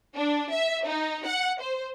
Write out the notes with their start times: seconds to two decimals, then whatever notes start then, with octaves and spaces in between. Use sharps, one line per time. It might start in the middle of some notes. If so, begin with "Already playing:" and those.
0.15 D4
0.52 E5
0.86 D#4
1.26 F#5
1.62 C5